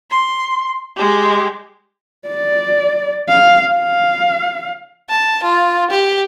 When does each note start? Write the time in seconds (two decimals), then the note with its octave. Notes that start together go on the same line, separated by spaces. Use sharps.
0.10 C6
0.97 G#3 G4
2.28 D5
3.29 F5
3.76 F5
5.10 A5
5.43 F4
5.91 G4